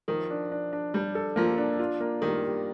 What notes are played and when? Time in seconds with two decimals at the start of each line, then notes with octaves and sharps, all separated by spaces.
0.08 D#3 F3
0.30 D4
0.52 D4
0.73 D4
0.94 G3 D4
1.15 A4
1.36 F3 A#3
1.58 D4
1.79 F4
2.00 A#3
2.22 D#3 G3
2.43 G3